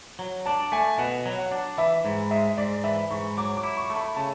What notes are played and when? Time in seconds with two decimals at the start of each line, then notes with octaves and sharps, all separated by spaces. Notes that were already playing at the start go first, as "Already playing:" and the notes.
0.19 F#3
0.46 D4 A5
0.72 A3 G#5
0.99 B2 F#5
1.26 F#3
1.39 F#5
1.52 D4
1.78 E3 E5
2.05 G#2
2.31 G#3 E5
2.57 G#2 D5
2.84 E3 E5
3.11 G#2 C#6
3.37 F#3 D6
3.57 D6
3.63 E4
3.77 C#6
3.90 A3
3.96 B5
4.16 C#3 A5